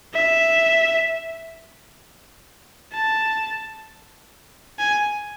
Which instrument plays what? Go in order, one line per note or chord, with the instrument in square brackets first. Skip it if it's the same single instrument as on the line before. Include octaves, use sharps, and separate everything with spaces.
[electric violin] E5
A5
G#5